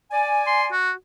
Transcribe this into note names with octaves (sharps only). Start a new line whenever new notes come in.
D5 G#5
C6
F#4